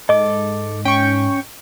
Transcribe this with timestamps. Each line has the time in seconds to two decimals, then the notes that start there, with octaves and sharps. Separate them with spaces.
0.09 G#2 A4 D#5 D6
0.85 C#4 G5 C#6